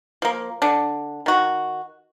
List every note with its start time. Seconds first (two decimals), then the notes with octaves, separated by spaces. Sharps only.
0.22 F3 A#3
0.62 D3 D4
1.26 D#3 F#4